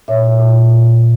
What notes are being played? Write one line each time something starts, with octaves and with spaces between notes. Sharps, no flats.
A#2 C#5 E5
A#2
A#2